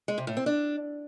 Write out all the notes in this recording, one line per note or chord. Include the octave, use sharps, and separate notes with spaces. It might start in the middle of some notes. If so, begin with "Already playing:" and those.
G#3
C3
A2
C4
D4